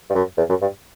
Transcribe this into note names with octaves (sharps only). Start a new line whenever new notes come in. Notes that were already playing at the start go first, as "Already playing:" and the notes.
G2
F#2
E2
F#2
G2